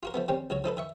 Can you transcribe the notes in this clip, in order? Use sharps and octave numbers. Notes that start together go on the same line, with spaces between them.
F4 F#4 A#4
F3 A3 B3
D#3 G3 C4 C#4
C#2 F#3 C#5
F3 D#4 A4 B4
D#3 E5 C#6